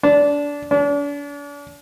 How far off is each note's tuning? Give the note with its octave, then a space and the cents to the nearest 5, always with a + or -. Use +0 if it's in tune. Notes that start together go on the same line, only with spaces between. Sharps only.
D4 -20
D4 -40